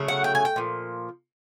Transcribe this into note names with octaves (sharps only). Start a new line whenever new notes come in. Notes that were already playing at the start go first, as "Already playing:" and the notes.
Already playing: C#3 F#3 A3
F#5
G5
G#5
G5
A#2 F3